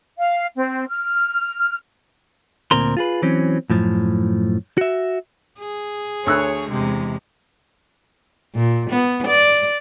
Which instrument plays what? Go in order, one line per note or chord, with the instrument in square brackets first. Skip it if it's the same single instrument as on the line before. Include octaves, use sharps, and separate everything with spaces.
[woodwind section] F5
C4
F6
[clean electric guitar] D2 A#2 C4 A#4 C6
F4 G#4 B4
E3 F#3 C4 C#4
F#2 A2 F3
F#4 E5
[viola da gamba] G#4
[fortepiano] D2 E6 F#6 [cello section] C#5
[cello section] E2 G#3 [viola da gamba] C3
[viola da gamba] A#2
B3
D5